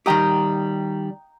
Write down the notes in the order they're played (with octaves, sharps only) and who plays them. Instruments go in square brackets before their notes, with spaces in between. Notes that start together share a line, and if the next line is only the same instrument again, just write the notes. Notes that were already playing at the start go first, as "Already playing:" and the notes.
[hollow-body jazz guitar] D#3 G3 G4 [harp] G5 A#5 D#6